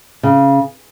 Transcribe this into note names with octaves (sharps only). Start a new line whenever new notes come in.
C#3